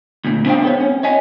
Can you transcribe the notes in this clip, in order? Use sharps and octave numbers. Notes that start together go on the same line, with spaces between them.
D2 A#2
C#4 D4 C5 C#5 F5 G5
B3 A4 C#5
C#4
C#5 D#5 G#5